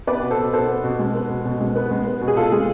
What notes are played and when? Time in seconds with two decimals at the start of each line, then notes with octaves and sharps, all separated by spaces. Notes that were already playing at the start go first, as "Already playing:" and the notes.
0.07 B3 B4 D5
0.23 B2
0.30 A4 C5
0.38 B2
0.53 B3 A4 C5
0.68 B3
0.84 B2
0.99 G#3
1.14 B3
1.29 B2
1.45 B2
1.60 G#3
1.76 B3
1.91 G#3
2.06 B3
2.21 B2
2.28 G#4
2.36 B2 F4 A4
2.52 G#3 G#4